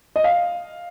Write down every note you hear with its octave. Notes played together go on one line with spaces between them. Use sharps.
D#5
F5